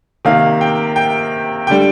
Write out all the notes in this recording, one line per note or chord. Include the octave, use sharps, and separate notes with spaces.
C3 D#3 A#3 F5
G5
G5
D3 G3 G5